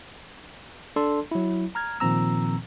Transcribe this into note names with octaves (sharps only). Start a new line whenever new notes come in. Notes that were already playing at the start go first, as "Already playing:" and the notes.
D4 A4 D5 A5 C6
F#3 E4
A#5 F6 G#6
A#2 D#3 F3 C4 A#5 E6